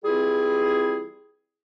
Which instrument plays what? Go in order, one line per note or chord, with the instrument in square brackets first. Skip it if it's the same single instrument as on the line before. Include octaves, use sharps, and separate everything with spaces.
[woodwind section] E3 G3 C4 E4 F4 G#4